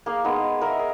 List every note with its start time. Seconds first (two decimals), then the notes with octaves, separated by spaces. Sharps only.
0.06 A#3 G#4 F5
0.24 G#3 B3 D#4 G#4
0.61 A#4 D#5 E5
0.79 G#4